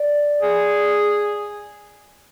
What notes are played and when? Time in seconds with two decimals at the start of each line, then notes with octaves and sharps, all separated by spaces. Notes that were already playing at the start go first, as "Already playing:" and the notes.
Already playing: D5
0.42 G#4